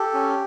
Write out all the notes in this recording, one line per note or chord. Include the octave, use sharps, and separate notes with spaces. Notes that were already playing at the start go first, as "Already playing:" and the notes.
Already playing: G4 A4
C#4